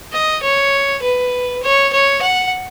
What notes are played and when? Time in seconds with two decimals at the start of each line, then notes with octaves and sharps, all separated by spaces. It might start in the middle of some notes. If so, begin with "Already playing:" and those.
0.13 D#5
0.43 C#5
1.02 B4
1.63 C#5
1.93 C#5
2.22 F#5